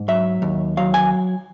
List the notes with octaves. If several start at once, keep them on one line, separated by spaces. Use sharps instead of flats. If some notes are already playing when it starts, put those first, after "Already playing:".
Already playing: G#2
F#3 E5
D#2
F#3 F5
G#5